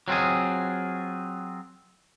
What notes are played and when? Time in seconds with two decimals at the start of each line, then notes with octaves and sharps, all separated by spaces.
0.08 F#3 C4 F4 G#4